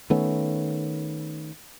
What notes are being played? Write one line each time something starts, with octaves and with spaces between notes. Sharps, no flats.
D#3 A3 B3 C#4